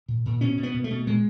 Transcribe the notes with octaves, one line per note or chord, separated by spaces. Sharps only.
A#2
A#2
B2 C#4
B2
B3
B2
A3
B2
A#2 G#3